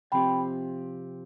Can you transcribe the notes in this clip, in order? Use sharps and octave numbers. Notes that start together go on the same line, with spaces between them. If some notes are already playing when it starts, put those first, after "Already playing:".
C3 F3 C4 G4 G5 B5